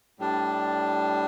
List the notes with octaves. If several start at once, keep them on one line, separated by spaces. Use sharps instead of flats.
A2 G3 D4